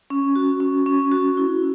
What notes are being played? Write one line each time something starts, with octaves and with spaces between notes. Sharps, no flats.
C#4
F#4
C#4
C#4
F#4
E4